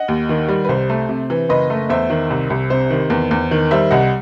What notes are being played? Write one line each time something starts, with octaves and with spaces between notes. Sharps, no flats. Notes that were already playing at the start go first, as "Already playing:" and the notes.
Already playing: D#5 F#5
D#2
D#3
G3
B4
C2 C5
A3
C3
E3
F#1 B4 D#5
A3
E2 C5 E5
D#3
C2
C2
C3 C5
D#3
E2
E2
D#3
G3 C5 E5
C2 D#5 F#5